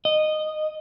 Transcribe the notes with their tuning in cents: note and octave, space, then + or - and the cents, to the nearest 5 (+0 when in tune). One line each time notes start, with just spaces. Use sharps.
D#5 -10